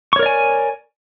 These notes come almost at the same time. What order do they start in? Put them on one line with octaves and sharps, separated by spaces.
C#6 C#5 A#4 D5 G#5